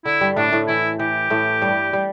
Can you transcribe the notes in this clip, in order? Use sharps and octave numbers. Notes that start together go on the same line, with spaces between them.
D3 E4
G2 G3
A2 A3 D4
A2 A3
E3 E4
E3 G4
A2 A3
G2 G3
G3